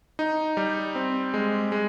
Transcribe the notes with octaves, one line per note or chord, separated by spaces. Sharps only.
D#4
G3
C4
G#3
G#3